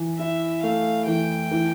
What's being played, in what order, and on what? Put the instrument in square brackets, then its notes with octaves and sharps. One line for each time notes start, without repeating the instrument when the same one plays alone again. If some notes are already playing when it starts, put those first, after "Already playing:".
Already playing: [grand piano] E3
[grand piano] E4 [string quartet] E5
[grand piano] A3 [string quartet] F5
[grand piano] E3 [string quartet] G5
[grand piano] E3